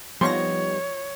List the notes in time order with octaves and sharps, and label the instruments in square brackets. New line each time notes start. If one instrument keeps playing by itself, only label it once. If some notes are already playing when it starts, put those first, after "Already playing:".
[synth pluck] F3 A#6 [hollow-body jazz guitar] G3 B3 D#4 [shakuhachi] C#5 [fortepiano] C6 C#6